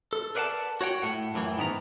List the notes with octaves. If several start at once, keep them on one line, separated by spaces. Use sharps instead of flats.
A4
A#4 B4 D5 F5 F#5 A5
F#4 C#5 F#5 G5
A2 F#5
F#2 A2 D3 E3
G#2 D#3 B3 A#5